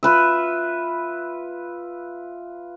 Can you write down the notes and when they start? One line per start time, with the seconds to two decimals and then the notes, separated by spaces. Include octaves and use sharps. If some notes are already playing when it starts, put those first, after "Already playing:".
0.03 F4 B4 E5